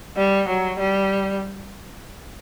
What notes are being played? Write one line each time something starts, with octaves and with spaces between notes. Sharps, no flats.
G3
F#3
G3